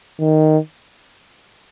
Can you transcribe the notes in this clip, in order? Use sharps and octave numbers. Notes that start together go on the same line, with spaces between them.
D#3